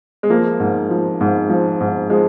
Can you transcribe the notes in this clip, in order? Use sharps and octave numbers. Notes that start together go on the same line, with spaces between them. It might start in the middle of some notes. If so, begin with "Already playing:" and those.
G#3
F3 A#3
G#2
F3
G#2
F3
G#2
F3 G#3